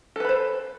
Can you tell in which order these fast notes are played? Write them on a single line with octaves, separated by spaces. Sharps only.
A4 B4 B5 C5